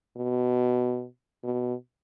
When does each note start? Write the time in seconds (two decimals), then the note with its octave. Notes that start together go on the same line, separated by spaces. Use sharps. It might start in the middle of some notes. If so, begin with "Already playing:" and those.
0.17 B2
1.44 B2